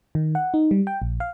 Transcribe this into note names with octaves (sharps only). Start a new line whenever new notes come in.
D#3
F#5
D#4
G3
G5
A#1
F5